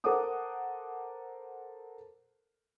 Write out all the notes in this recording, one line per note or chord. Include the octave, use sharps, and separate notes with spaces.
A4 A#4 C5 F#5 D6 D#6